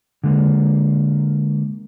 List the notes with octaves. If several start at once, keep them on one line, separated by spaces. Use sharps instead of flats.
D3 G#3 A#3